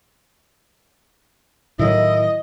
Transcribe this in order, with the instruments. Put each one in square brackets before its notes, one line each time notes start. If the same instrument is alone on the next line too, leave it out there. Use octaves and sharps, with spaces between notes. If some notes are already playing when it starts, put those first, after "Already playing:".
[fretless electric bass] A2 D#3 F#3 [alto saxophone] E4 [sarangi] D#5